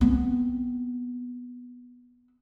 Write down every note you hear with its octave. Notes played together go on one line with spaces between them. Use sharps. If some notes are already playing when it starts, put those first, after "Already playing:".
B3 C4